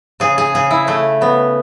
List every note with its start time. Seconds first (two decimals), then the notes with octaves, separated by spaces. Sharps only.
0.20 C#3 G#4
0.38 G#4
0.55 C#3 G#4
0.71 E4
0.87 C#3 A3
1.21 C#3 B3